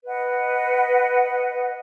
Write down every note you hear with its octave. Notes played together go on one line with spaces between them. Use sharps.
B4 D#5 F#5